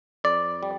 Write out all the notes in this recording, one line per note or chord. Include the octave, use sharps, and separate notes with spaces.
F2 D5
G3